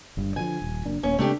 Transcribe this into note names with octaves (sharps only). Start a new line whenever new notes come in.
G1 G2
D3 F3 G#5
D#1
F#1 A#3 D4
D#1 A#3 C#4
C#3 G#3 A3 C4 D4 G4